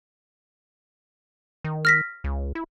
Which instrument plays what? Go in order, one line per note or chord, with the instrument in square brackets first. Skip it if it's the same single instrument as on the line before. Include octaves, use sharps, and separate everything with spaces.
[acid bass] D#3
[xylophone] F6 A#6 B6
[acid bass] C#2
E4